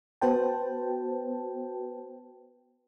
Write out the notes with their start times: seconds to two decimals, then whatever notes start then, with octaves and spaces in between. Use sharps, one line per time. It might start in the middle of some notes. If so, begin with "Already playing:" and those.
0.21 B3 F#4 B4 C5 G5 A5